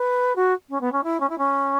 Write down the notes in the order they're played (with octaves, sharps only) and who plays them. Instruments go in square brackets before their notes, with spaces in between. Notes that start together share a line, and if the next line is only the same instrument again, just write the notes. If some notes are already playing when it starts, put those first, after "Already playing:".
Already playing: [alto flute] B4
F#4
C#4
B3
C#4
E4
C#4
E4
C#4